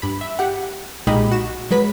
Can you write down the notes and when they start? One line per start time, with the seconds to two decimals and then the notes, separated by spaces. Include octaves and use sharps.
0.02 G2 B5
0.21 E5
0.39 G4 F#5
1.07 B1 A#2 G#3 D#4 G4 B5
1.32 F#4 E7
1.71 F#3 G#3 B4 B6